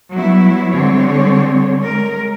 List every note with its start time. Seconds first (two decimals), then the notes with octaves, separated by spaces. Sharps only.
0.13 F#3 G3 B3 E4
0.72 D3 G3 G#3 C4 C#5
1.83 G#3 A#4